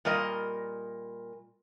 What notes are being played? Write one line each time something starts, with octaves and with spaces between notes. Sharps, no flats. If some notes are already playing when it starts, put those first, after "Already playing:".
A#2 G3 A#4 D#5